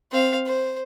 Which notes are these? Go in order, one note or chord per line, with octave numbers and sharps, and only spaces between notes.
C4 F5
C5